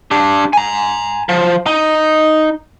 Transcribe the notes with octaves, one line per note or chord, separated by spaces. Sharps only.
D4 G4
G#5 A#5
F3
D#4